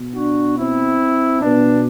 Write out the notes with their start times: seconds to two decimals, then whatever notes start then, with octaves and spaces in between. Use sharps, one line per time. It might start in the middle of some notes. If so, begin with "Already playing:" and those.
Already playing: B2
0.15 D4 F#4
0.57 C4 E4
1.41 B2 B3 D4